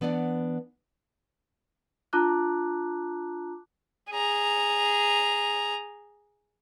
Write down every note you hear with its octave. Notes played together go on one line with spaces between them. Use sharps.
E3 B3 D4 D5 F#5
D4 F4 A5 A#5 D6 F#6
G#4 A#5